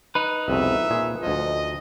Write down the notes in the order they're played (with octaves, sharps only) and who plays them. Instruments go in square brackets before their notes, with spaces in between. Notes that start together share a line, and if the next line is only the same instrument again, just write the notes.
[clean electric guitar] D#4 B4
[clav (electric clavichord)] C2 F2 B2 [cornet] E5
[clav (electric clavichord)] A#2 G#4
[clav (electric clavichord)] D2 F3 [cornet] D#5